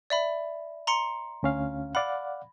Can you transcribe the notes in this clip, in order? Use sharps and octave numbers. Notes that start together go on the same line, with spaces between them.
D5 E5 B5
A#5 C6 C#7
D2 C#4 F5
D5 F5 F#5 B5